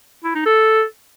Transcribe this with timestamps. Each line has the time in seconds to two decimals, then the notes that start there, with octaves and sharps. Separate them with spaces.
0.24 E4
0.35 D#4
0.46 A4